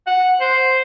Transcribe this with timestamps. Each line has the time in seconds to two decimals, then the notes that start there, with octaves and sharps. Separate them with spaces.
0.07 F#5
0.40 C5